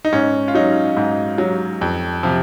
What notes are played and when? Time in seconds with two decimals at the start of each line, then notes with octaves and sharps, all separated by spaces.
0.05 D#4
0.13 G#2 C#4
0.48 F4
0.55 F#3 D#4
0.97 G#2
1.38 F#3
1.81 F2
2.23 C3 F3